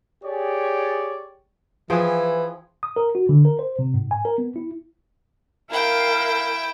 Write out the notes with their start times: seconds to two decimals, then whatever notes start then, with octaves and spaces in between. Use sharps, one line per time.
0.24 G4 G#4 C#5 D5
1.90 E3 F3 G#4 G5
2.83 D#6
2.96 A#4
3.15 F#4
3.29 D3
3.45 A#4
3.59 C5
3.79 C3
3.94 G#2
4.11 G#5
4.25 A#4
4.38 B3
4.56 E4
5.71 E4 A#4 F5 G5